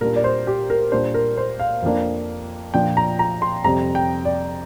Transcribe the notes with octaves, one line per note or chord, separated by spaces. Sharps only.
A#2 G3 D4 A#4
D5
C5
G4
A#4
A#2 G3 D4 C5
A#4
C5
F5
F2 F3 A#3 D4
A#2 F3 D4 G5
A#5
A#5
C6
F2 C3 G3 C4 A#5
G5
D5